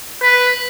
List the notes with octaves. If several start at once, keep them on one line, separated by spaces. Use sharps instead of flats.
B4